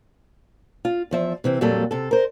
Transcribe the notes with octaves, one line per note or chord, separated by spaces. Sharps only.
F4
E2 F3 E5
C3 E3 C4
F2 A#2 F#3 G3 A#3 A4
C3 A4
A#4 C5